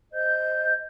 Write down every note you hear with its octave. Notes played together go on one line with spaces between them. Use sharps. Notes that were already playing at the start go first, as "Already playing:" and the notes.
C5 D#5 G6